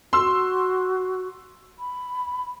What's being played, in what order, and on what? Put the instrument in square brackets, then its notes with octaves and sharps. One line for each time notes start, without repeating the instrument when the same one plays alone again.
[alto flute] F#4 [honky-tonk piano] C6 E6
[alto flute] B5